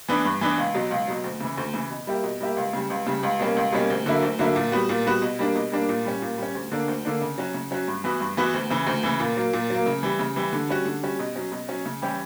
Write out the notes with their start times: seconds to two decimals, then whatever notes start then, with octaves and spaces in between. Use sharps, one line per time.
0.08 E3 B3 D4
0.25 G2
0.41 E3 B3 D4
0.58 C#2
0.75 B2 F#3
0.91 C#2
1.08 B2 F#3
1.24 D2
1.40 C#3 E3
1.57 D2
1.74 C#3 E3
1.90 B2
2.07 G3 A#3 E4 G4
2.24 B2
2.41 G3 A#3 E4 G4
2.57 C#2
2.73 C#3 G3
2.90 C#2
3.07 C#3 G3
3.23 C#2
3.39 B2 G3 A#3 C#4
3.57 C#2
3.73 B2 G3 A#3 C#4
3.90 D2
4.06 D3 F#3 A#3 E4
4.22 D2
4.39 D3 F#3 A#3 E4
4.56 A#2
4.72 G3 B3 F#4
4.89 A#2
5.06 G3 B3 F#4
5.22 B2
5.39 G3 A#3 D4
5.55 B2
5.72 G3 A#3 D4
5.89 A#2
6.05 G3 C#4
6.22 A#2
6.38 G3 C#4
6.55 D2
6.72 D3 A#3 D4
6.88 D2
7.05 D3 A#3 D4
7.22 C#3
7.38 F#3 C#4 F#4
7.54 C#3
7.71 F#3 C#4 F#4
7.88 G2
8.04 E3 B3 F#4
8.20 G2
8.37 E3 B3 F#4
8.54 D2
8.70 C#3 E3
8.87 D2
9.03 C#3 E3
9.20 A#2
9.37 F#3 A#3
9.53 A#2
9.70 F#3 A#3
9.86 C#3
10.03 E3 G3
10.19 C#3
10.36 E3 G3
10.53 D3
10.69 G3 C#4 F#4
10.85 D3
11.03 G3 C#4 F#4
11.19 B2
11.36 F#3 C#4
11.52 B2
11.69 F#3 C#4
11.86 C#3
12.02 E3 G3 C#4 G4